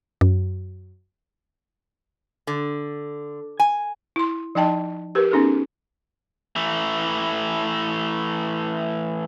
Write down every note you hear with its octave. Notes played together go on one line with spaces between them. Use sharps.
F#2
D3
G#5
E4 C6
F3 D#4 D#5 G5 A5
G4 A#4 B4
B3 C#4 D#4 G#4 A4
E3 A3